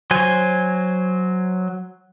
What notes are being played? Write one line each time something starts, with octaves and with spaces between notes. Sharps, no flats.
F#3 C5 G#5